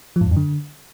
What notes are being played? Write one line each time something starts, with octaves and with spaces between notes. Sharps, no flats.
F3
G#2
E2
F#2
D3